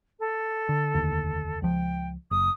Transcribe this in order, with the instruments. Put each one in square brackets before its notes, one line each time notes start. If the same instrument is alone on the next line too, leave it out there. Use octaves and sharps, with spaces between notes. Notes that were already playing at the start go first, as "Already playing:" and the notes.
[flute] A4
[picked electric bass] D3
F1 D#2 D3
[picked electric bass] C#2 F3 [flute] G5
[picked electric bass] F#1 [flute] D#6